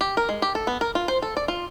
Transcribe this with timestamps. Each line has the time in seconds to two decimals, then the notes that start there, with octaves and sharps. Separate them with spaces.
0.01 G4
0.17 A#4
0.29 G#3
0.42 G4
0.55 A4
0.67 B3
0.81 A#4
0.95 F4
1.08 C5
1.22 A4
1.37 D5
1.48 F4